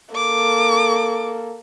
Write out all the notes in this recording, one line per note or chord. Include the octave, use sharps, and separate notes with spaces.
A#3 A4 D6